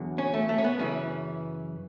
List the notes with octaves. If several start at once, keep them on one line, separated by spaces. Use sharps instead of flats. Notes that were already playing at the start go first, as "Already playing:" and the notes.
Already playing: E2 D3 F#3
C#4
A3
A3
C#4
B3
F#2 C#3 E3 C#4